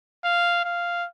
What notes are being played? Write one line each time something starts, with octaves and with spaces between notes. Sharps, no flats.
F5
F5